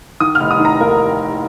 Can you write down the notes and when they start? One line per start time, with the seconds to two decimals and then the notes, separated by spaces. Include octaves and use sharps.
0.20 D#3 D#6
0.35 F6
0.40 F1
0.51 D#6
0.60 D#3
0.65 A#5
0.81 D#2 A#4